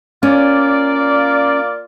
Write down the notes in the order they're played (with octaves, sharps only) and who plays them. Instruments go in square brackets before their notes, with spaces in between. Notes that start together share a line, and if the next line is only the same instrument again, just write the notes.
[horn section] A#3 F4 D5 [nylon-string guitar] C#4